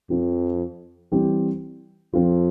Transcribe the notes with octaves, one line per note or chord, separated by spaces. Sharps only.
F2 F3 C4 F4
E3 G3 C4 G4
F2 F3 C4 F4